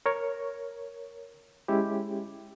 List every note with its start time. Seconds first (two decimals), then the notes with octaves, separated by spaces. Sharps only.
0.06 A#4 C#5
1.68 G#3 C#4 E4 G4